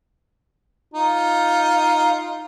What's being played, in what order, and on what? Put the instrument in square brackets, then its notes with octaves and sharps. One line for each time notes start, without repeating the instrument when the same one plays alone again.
[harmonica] D#4 F4